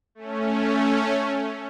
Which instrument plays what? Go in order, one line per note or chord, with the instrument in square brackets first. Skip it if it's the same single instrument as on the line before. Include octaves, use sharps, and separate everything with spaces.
[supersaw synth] A3 C#4